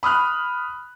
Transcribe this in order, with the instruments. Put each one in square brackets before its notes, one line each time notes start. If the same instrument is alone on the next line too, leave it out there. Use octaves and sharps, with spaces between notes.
[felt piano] B5 D#6 F6 F#6